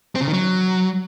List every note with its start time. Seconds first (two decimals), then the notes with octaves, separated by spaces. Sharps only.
0.15 C4
0.21 C#3
0.27 D#3
0.34 F#3